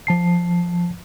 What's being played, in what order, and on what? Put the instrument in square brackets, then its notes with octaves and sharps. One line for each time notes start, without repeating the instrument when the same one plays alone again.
[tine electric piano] F3 A5 C7